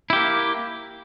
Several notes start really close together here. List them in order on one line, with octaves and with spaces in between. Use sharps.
E4 G4 A#3